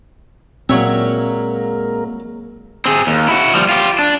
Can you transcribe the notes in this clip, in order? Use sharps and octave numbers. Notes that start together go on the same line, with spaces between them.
A#2 F#3 G#3 A#3 C4 A#4 C#5 E5
C4 G#4
D#2
E4 F#4
F3 G3
F4 G4
D4